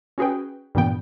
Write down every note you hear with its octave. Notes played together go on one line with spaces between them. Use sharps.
C#4 F#4 G#4 B4 G5
G2 A#2 E3 B3 G5